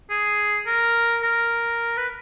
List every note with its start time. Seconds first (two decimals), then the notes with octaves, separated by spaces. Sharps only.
0.10 G#4
0.67 A#4
1.23 A#4
1.97 B4